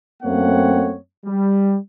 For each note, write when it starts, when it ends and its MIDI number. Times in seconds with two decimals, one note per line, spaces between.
0.23 0.95 42
0.23 0.95 57
0.23 0.95 58
0.23 0.95 60
0.23 0.95 73
0.23 0.95 78
1.25 1.76 55